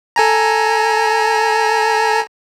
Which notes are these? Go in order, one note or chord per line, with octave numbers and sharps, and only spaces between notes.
A4 G#5 A#5